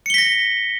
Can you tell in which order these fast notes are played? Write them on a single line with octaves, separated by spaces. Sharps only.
C#7 G7 B6 A#6